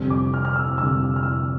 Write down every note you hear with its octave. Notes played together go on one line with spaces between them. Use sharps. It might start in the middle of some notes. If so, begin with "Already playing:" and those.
Already playing: F1 F2 D3 G3
D6
F6
F6
E6
F1 F2 D3 G3 E6
F6
E6